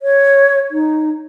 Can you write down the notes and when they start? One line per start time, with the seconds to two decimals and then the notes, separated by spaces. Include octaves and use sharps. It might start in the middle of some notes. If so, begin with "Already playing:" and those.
0.02 C#5
0.71 D#4